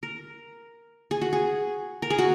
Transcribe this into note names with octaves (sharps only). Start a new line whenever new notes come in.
A#4
G#4
F#4
G#4
A#4
G#4
F#4